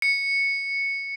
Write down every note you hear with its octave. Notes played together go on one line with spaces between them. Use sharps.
C#7